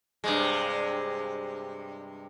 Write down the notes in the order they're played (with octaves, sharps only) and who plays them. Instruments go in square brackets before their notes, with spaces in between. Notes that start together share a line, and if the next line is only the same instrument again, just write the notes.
[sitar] G2 C3 G#3